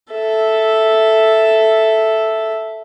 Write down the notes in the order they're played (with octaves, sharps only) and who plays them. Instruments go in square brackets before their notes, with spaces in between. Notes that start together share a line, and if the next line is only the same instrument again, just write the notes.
[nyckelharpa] A4 E5